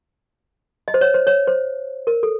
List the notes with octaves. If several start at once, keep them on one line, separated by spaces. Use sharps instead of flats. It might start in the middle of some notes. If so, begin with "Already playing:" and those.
D#5
C5
C#5
C5
C#5
C5
A#4
A4